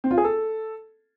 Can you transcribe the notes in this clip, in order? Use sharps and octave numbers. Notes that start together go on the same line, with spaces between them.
C4
F4
G#4
A4